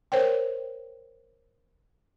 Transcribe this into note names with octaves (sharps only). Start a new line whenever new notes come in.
A#4 C5 C#5 G5